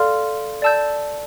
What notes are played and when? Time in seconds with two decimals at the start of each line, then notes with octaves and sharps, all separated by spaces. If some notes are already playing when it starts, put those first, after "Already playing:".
Already playing: A4 D5 F5 C6 F6
0.62 D5 A5 E6 G6